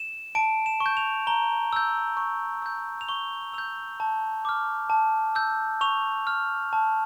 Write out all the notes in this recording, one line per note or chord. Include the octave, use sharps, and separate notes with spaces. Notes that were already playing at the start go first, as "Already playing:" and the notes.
Already playing: E7
A5 D7
E7
C#6
G6
F7
A#5 G7
E6 G6
C#6
E6 G6
F7
C#6 G7
E6 G6 F7
A5
D6 F6
A5
E6 G6
C#6 F7
F6
A5